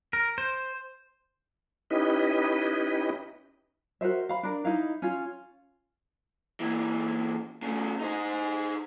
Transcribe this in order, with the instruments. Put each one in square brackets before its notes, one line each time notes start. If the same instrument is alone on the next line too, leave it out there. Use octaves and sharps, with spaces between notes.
[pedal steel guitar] A#4
C5
[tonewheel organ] C#4 D#4 E4 G4 B4 D#5
[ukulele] F#4 A#4 C5 E5
F5 B5
D4 A#4
D#4 E4 F5
C#4 F4
[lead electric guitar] A#2 E3
C#3 A3
D#4 C5